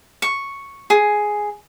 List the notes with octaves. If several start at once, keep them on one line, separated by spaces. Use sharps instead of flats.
C#6
G#4